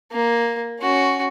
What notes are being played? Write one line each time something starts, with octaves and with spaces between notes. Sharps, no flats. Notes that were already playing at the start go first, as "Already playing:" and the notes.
A#3
C#4 F#4